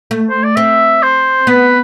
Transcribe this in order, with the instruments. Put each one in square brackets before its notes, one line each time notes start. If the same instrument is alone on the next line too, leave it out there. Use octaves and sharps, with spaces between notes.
[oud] A3
[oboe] C5
D5
[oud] C4 [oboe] E5
[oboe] C5
[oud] B3 [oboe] B4